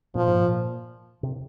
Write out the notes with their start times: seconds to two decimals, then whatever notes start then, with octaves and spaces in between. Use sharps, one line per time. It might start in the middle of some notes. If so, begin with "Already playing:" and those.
0.15 A#2 F3
0.27 G#2
0.40 A#2
1.23 C3